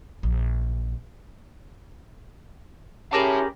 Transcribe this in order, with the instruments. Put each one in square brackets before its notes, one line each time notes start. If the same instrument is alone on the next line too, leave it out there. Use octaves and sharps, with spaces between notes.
[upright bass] A#1
[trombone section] C#4 G4 [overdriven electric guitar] E4 A5 [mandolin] G#4 A#4 D6